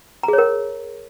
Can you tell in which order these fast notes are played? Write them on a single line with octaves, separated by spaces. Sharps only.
A#5 G#4 C#5 A#4